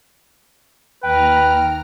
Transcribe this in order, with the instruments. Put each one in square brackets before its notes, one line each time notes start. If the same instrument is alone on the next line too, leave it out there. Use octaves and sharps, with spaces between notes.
[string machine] D#2 A#5 F6 [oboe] B4 [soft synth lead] G5